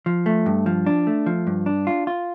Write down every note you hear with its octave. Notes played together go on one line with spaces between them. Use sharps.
F3
A3
G2
F3
D4
A3
F3
G2
D4
F4
F4